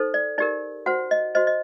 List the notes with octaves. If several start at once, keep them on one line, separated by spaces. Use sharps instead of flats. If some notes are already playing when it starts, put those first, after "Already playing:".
Already playing: D#4 A4 C5
D5
D#4 G4 A#4 D5
F#4 C5 F#5
D#5
F#4 C5 D#5
D#5